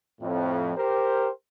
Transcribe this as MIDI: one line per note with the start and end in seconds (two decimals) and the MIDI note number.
0.21 0.73 41
0.21 0.73 45
0.77 1.29 67
0.77 1.29 70
0.77 1.29 72